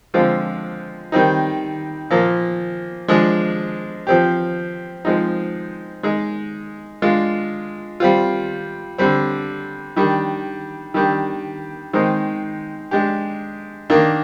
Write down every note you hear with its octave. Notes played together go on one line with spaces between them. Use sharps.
D3 F3 G#3 C4 F4
D#3 G3 C4 D#4
A#2 F3 A#3
F3 G#3 D4 G#4
F3 C4 G4
F3 G#3 C4 D#4
G#3 D#4 G#4
G#3 D4 F4
G3 C4 F4
D3 G3 C4
D#3 G3 D4
D#3 G3 D4 G4
D#3 G#3 C4 D#4
G#3 D4 G4
D#3 A#3 D4